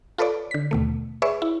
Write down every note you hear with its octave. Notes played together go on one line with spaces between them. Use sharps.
F4 A4 B4 C#5 D5
D3 B6
D#2 B2 A3
G#4 B4 C#5 D5 E5 C#6
E4